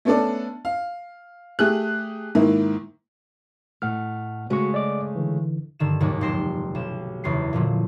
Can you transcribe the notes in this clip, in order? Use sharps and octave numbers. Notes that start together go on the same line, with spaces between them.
A3 B3 C#4 D4 A4 D5
F5
A3 G4 G#4 F#6
G#2 D#3 A#3 E4
A2 A3 F#5 F6
C#3 G#3 A3 F#4 C#6
D5 D#5 D6
D3 E3
G2 D3 D#3 E7
D#2 G#2 C3 F3 F#3 G#3
F1 G#3 G4 C6 A#6 E7
B1 E7
F#1 E2 C#3 C#4 C6 C7
A#2 D3 F3 F#3